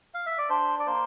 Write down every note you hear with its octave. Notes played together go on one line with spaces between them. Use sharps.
F5
E5
D5
D4 C5
D5
A#3 C5